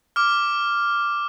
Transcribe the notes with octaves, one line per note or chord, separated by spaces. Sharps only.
D6 F6